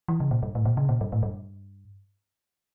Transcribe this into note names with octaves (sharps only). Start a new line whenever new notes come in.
E3
C#3
A#2
G2
A2
A#2
C#3
A#2
G2
A2
G2